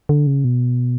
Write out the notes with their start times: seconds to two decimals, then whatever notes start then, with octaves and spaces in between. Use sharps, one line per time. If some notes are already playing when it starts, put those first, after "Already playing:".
0.09 D3
0.27 C#3
0.45 B2